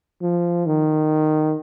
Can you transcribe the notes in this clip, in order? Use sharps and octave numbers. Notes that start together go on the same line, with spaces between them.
F3
D#3